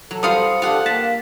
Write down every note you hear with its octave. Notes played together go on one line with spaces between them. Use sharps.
F#3 A4
G3 F4 C5 F5 C6 D#6 C#7
D4 F4 G4 A4 F5 F#5
A#3 A5 B6